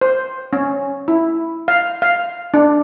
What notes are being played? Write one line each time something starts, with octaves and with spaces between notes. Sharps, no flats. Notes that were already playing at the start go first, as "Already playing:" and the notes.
C5
C#4
E4
F5
F5
D4